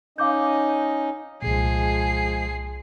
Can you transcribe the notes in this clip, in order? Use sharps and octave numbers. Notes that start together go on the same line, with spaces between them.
C#4 D#4 D#5 F5 D6 G6
C2 A#2 F3 G#3 G#4 C7